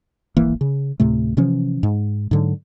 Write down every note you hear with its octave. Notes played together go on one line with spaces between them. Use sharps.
D1 G#1 E3 A#3
C#3
D2 A2 C3 A3
C3 E3 F3 C#4
G#2
G#2 D3 F#3